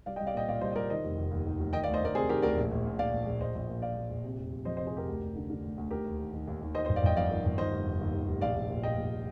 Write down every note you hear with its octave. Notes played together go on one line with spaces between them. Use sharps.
C2 D5 F5
D#5 G5
C2
D5 F5
A#2 D#5 G5
A#2 D5 F5
C2 C5 D#5
D#5
C2 A#4 D5
D#3 C5 D#5
F1
F1
D#2
D#3
F1
D#3 D#5 G5
D5 F5
D2
C5 D#5
D2 A#4 D5
C3 G#4 C5
D#3 G4 A#4
D2 A#4 D5
A#1
A#1
A#2
A#2 D5 F5
A#1
A#1
A#1 C5 D#5
A#1
A#2
A#2 D5 F5
A#1
A#1
C3
F1
F1
F2 C5 D#5
C3 C5 D#5
G#4 C5
F1 G4 A#4
D2
D2
D3
D3
D2
D2
D#2 G4 A#4
D#2
D#3
D#3
D#2
D#2
D#3 C5 D#5
C5 D#5
G1
D5 F5
G1 D#5 G5
F2 D5 F5
D#3
G1
D#3 C5 D#5
F1
F1
D#2
D#3
F1
A#1 D5 F5
A#1
A#2
A#2 D#5 G5
A#1